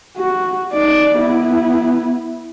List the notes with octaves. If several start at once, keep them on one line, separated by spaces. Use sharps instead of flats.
F#4
D#4 D5
B3 E4